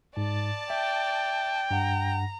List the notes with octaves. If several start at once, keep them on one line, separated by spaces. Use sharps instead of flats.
G#2 D5 A5
E5 G5
G2 F#5 A#5